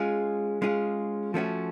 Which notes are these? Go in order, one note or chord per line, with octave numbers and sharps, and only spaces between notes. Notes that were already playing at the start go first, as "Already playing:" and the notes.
Already playing: G#3 C#4 F4 G#4
G#3 C#4 F4 G#4
F3 A3 C#4 F#4